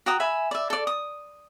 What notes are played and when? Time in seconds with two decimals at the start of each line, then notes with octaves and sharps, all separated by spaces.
0.06 F#4 G5 A#5 D#6
0.20 E5 G#5 B5
0.51 D5 E5
0.70 A4 D5
0.87 D#6